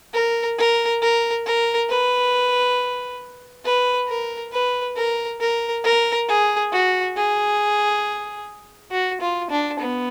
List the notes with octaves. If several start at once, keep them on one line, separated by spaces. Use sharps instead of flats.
A#4
A#4
A#4
A#4
B4
B4
A#4
B4
A#4
A#4
A#4
G#4
F#4
G#4
F#4
F4
D4
B3